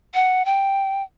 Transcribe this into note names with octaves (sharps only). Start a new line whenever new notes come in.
F#5
G5